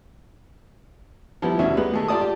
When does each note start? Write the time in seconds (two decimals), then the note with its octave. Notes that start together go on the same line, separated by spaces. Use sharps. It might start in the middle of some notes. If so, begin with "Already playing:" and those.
1.42 F3 G3 B3 E4
1.59 D2 C#4 E5
1.77 G3 G#3 B3 B4
1.93 G#3 A3
2.08 F4 G4 D5 A5 D#6
2.21 G4